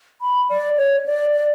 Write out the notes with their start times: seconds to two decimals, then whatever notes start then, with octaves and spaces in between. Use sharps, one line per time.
0.22 B5
0.50 D5
0.77 C#5
1.06 D5
1.34 D5